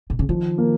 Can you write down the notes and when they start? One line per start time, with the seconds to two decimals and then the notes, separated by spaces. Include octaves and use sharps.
0.10 B2
0.19 C#3
0.29 D#3 F3
0.58 A#3